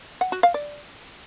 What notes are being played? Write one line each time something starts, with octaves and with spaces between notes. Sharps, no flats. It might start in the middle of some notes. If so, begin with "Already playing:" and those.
F#5
F#4
F5
D5